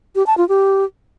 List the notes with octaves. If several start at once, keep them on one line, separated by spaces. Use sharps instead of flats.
G4
A5
F4
G4